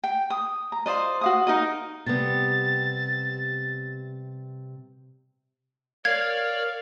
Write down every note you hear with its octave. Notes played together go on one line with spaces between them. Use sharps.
G5
D#6
A#5
F4 C5 D5 D#5
F#4 F5 D#6
D#4 A#4 D#5
C3 G3 B3 A6
A#4 C#5 D5 F5 G#6